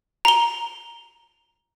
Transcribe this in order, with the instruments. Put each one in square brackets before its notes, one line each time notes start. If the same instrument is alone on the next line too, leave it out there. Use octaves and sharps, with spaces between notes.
[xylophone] A#5 G7